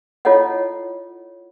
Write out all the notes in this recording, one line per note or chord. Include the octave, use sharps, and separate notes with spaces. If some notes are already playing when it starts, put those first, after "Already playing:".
E4 F4 A4 C#5 D#5 F#5